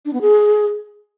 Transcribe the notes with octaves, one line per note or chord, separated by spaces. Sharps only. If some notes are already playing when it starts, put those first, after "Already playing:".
D4
B3
G#4